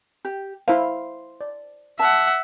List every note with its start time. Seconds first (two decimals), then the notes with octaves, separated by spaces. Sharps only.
0.25 G4
0.68 E4 C5 F5
1.41 D5
1.99 E5 F#5 A5